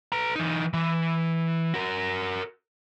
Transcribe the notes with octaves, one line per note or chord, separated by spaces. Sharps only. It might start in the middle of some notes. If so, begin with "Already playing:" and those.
B4 A#5
E3 D#4
E3
F#4 A#4